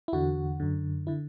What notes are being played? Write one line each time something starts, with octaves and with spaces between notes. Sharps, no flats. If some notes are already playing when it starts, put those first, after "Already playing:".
E4
E2 D3 F#4
F#2 D3
D3 E4